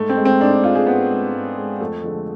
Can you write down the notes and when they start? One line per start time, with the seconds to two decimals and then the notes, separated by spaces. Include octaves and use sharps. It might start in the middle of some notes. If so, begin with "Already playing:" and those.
Already playing: G#2 A3
0.09 C4
0.17 G#3
0.25 C4
0.40 G#2 D4
0.52 D4
0.64 G#3 F4
0.75 G#4
0.87 G#2 B3
1.10 G#3
1.34 G#2
1.57 G#3
1.81 F2 A3
2.04 D3 F3 G#3